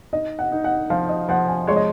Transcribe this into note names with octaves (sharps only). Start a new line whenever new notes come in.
D#4 D#5
F#5
D#4
F#5
F3 F5
D#5
F3 F#5
G#5
G#3 C#5
D#5